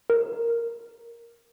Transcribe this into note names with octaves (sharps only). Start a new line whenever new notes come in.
A#4